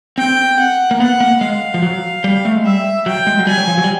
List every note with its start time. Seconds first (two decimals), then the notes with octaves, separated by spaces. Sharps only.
0.18 C4 G5
0.60 F#5
0.91 A#3
1.00 B3 F#5
1.20 A#3
1.41 G#3 F5
1.74 F3
1.82 F#3
2.24 G3
2.45 A3
2.55 G#3
2.64 G3 E5
3.06 F#3 G5
3.27 G#3
3.39 F#3
3.47 G3 G#5
3.57 F#3
3.68 F3
3.78 F#3
3.84 G3